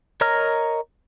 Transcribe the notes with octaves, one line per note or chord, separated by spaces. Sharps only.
A#4 C#5 D#5 A#5 F6